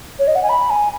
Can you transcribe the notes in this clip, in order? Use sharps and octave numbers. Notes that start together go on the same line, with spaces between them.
C#5
D#5
F#5
G#5
B5
G#5